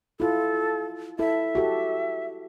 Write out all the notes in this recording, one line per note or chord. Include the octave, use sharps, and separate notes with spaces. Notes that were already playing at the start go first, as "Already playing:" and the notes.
E4 F4 A4
E4 A4 E5
F#4 G4 A4